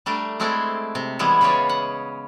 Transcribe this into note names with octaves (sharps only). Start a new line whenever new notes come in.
G3 A3 D4 A#4
G#3 A3 C4 E4 A4 D5
C3
E3 G3 G#3 B3 E4
C#3 B3 C#4 F4 C#5 D5
F#5